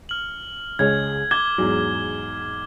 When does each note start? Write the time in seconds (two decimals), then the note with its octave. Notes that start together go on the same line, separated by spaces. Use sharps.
0.09 F6 F#7
0.79 C#2 G#3 C#5 G#6
1.31 D6 G#6 G7
1.58 E2 G#2 F#3